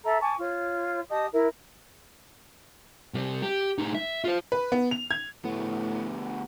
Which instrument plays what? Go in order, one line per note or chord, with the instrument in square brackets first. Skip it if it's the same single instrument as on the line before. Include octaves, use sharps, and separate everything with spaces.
[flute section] A4 E5 A#5
G#5 A5 C#6 D6
F4 C#5
G4 D#5 A5 D#6
E4 A#4
[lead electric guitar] C3 G3
G4
A2 D#4
E5
F4 C5
[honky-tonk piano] B4
B3
F7
G#6
[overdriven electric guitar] D2 B3 [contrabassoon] A2